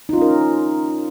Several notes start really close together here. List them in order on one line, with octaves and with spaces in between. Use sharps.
D#4 F4 C#4 A#4